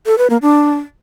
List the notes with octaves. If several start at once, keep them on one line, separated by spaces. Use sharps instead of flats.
A4
B4
A#3
D4